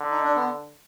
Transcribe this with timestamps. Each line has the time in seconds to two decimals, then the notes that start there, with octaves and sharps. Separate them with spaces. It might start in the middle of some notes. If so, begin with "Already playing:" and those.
Already playing: D3
0.10 D#4
0.24 D4
0.36 B3